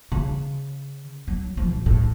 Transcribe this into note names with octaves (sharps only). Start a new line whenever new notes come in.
C#3
F#3
F3
A#2
A2